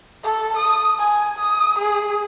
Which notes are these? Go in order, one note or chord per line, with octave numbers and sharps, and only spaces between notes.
A4
D#6
G#5
D#6
G#4